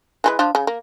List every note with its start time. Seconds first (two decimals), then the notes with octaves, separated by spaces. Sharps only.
0.24 E3 G#3 B4
0.39 F3 D4 C5
0.55 C#3
0.67 A#3